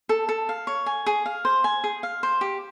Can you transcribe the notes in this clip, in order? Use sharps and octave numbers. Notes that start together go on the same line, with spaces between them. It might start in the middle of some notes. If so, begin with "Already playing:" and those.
A4
A4
F5
C#5
G#5
G#4
F5
C5
G#5
G#4
F5
C5
G4